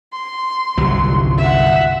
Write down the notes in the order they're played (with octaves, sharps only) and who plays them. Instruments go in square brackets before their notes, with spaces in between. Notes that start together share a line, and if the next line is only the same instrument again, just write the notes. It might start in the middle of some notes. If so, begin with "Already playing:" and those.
[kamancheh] C6
[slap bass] G1 C2 F#3
[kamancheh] E5 F#5